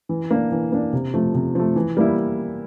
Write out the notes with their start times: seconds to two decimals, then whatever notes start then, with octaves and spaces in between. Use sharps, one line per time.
0.09 E3
0.31 A#3 D4
0.52 E3
0.72 A#3 D4
0.93 C3
1.14 F3 A3
1.34 C3
1.55 F3 A3
1.76 E3
1.97 G3 A#3 E4